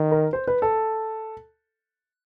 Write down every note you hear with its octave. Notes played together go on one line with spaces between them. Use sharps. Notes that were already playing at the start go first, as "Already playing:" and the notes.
Already playing: D#3
A#4
C5
B4
A4